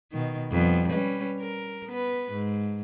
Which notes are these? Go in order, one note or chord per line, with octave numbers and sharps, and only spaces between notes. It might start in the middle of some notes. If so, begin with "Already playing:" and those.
B2 D#3
F2 G3 B3
G3 C#4 B4
A#4
B3 B4
G#2